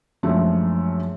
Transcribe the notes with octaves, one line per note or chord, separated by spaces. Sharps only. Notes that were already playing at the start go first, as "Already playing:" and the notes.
F#2 F3 G#3 A3 D4